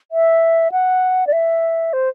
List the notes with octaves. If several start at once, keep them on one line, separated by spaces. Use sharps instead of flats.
E5
F#5
D5
E5
C5